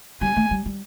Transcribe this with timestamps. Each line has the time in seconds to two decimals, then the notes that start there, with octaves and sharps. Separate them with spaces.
0.21 G3 G#5
0.36 A3
0.51 G3
0.66 G3